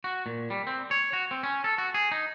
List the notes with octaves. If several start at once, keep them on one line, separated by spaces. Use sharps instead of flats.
F#4
A#2
G3
C4
C#5
F#4
C4
C#4
A4
F#4
G#4
D#4